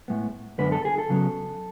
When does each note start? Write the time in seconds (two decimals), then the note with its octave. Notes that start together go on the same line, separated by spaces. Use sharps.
0.08 A2 G#3 B3
0.58 F#2 D3 G#3 B3 B4
0.72 A4
0.85 G#4
0.98 A4
1.08 C#2 C#3 F#3 B3